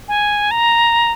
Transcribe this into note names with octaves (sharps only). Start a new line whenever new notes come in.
G#5
A#5